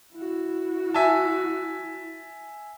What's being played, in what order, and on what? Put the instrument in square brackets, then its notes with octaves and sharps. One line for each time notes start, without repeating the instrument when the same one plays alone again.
[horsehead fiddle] E4 F#4
[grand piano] E5 G#5 A5